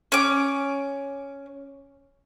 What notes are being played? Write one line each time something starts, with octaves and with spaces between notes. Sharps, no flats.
C#4 D6